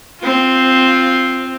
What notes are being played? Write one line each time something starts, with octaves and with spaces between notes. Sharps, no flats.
C4 F4